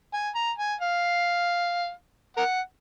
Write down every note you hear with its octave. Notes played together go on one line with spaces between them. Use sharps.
G#5
A#5
G#5
F5
A#4 F#5